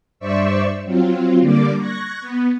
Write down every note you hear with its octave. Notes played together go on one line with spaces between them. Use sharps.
G2 C5 D5 E5 C#6 E6
F#3 C4 F4
D3 G3 A#3 D5 D6
C#6 F#6 G#6 A#6
B3